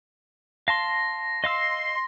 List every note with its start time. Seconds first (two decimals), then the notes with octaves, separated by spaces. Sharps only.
0.68 F5 A5 C6 A#6
1.44 D#5 F5 C6 E6